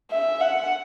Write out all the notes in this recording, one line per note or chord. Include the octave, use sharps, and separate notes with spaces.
E5
F#5